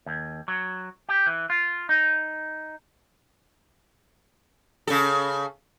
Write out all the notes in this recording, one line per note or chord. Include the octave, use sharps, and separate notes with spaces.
D#2
F#3
G4
E3
F4
D#4
C#3 A4